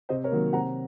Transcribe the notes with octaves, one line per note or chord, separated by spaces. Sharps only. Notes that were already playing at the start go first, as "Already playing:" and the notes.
C3 C5 D#5
A#4 C#5
D#3 F#3 A#3
C3 F#5 A#5